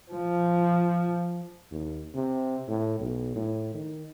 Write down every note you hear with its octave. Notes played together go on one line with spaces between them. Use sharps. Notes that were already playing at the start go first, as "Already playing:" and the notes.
F3
D#2
C3
A2
B1
A2
D#3